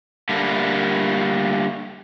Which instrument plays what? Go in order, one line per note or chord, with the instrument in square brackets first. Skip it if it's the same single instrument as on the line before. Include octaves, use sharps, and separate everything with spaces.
[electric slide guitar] D3 G3 A3 A#3